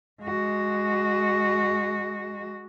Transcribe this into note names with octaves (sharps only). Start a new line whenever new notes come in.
G#3 F#4